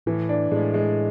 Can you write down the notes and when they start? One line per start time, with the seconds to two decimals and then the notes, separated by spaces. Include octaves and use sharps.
0.06 A2 E3
0.29 D4
0.51 A2 G#3
0.74 G#3